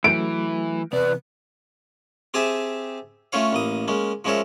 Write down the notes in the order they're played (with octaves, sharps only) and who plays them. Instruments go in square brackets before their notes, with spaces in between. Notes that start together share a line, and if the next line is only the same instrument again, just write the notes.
[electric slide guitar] E3 [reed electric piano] F#3 A3 [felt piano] D7
[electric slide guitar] E2 D5 [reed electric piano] C3 [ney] B4
[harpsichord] C4 G4 G#4 E5 G#5 A5
A3 C#4 F4 C#5 F5
A1 A#3 D#6
G#3 A#3 C#4
F3 G#3 C#4 A#4 C#5 E5